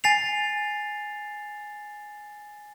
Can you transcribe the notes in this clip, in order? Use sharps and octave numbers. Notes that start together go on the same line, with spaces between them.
G#5 A6 C7 F7